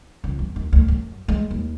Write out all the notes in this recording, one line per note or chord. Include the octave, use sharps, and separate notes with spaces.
C#2
E2
D#2
D2
F#2
G#3
D#2